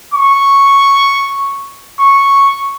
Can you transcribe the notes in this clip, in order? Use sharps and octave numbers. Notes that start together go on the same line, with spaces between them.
C#6
C#6